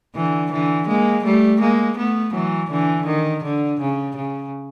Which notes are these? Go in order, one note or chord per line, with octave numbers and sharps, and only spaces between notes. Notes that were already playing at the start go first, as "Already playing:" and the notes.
D3 E3
D3 E3
G#3 A#3
G3 A3
G#3 A#3
A3 B3
E3 F#3
D3 E3
D#3
D3
C#3
C#3